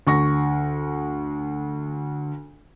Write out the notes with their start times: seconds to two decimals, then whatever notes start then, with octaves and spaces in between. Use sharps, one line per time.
0.07 D2 C#6 A#6